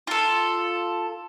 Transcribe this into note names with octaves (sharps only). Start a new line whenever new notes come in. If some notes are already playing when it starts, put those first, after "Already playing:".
F4 A4